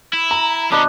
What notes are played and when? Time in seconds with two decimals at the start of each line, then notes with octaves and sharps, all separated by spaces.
0.13 E4
0.31 A#5
0.72 B2 C#4 D4 D#5 B5